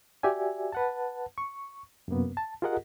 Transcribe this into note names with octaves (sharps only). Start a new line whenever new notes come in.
F#4 G4 D5 E5 G#5
B4 F#5 A5
C#6
F#2 C3 A#3 B3
A5
F4 G4 G#4 A#4 D#5 F#5